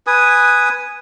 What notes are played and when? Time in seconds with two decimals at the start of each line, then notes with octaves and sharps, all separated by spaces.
0.07 B4 G#5 D#6